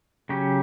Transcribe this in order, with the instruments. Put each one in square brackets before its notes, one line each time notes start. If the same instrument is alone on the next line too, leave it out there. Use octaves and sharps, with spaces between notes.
[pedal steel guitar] C#3 F#3 C#4 G4